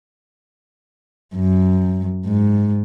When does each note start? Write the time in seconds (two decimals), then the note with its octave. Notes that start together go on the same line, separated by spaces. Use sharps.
1.35 F#2
2.26 G#2